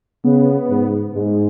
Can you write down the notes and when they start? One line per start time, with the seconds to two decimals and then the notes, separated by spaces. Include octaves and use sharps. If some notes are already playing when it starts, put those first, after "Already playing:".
0.25 C#3 B3
0.70 G#2
1.15 G#2 G#3